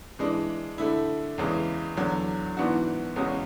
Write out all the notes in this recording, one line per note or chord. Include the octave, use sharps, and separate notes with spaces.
E3 G#3 D4
D3 A3 E4
E2 C#3 E3 G#3
E2 D3 F#3
G#2 E3 B3 D4 F#4
E2 C#3 G#3 C#4 F#4